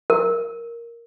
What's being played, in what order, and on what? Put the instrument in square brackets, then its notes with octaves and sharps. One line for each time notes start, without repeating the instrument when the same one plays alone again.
[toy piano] A#4